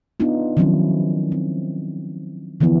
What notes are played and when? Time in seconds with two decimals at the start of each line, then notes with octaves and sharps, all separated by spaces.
0.20 B3 D4 D#4 F4
0.57 D#3 F3 F#3 C4 C#4 E4
1.32 C4
2.60 D3 E3 F3 B3 E4